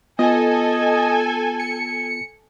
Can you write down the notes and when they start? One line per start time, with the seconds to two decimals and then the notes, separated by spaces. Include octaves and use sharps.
0.19 B3 F4 A4 D#5 G#5
1.60 C#7